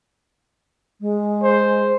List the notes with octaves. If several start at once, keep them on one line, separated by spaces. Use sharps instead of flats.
G#3
C5